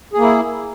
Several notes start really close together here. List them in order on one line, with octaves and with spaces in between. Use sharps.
G#4 A#3 E4